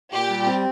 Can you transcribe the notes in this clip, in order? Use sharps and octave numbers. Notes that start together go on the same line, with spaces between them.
A#2 G4
G3
C4